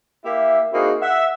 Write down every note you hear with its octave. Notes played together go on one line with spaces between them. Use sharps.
A#3 E4 G4 E5
A#3 C4 D#4 E4 F#4 G#4
E5 F#5